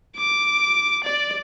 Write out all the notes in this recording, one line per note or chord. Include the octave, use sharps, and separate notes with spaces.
D6
D5